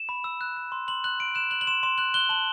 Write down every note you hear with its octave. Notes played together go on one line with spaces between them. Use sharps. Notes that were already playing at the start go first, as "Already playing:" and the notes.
Already playing: E7
B5
E6
F#6
F#6
C6
C6 F#7
F#6 F#7
F#6 D7
F#6 E7
F#6 F#7
F#7
C6 E7
C6 E7
F#6 F#7
F#6 G7
A5 F#7